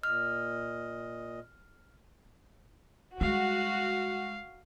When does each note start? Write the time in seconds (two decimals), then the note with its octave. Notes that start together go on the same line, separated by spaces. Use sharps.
0.03 A#2 D#5 F6
3.21 G3 G#3 F#4 F5